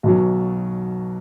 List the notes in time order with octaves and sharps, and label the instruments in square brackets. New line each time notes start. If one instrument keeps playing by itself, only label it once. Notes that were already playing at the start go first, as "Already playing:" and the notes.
[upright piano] B1 B2 F#3